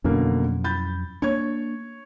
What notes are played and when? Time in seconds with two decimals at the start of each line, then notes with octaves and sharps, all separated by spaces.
0.04 F2 B2 D3 F#3 A#3 C#4
0.64 B5 G6 A6
1.22 A#3 D4 C#5 C#6 G#6